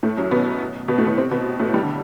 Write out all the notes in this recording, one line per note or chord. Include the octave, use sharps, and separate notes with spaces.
A2 A3
F#2 F#3
B2 B3
B2 B3
A2 A3
B2 B3
C3 C4
B2 B3
A2 A3
G2 G3
D3